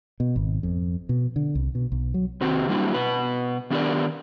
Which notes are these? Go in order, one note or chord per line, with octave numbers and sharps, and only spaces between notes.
B2
G#1
F2
B2
D3
C2
B2
B1
F#3
C3 D#3 C4 F#4 G4
F#3 G3 A#3 D4 E4 F#4
B2 B4
D#3 B3 D4 G4 A#4 D5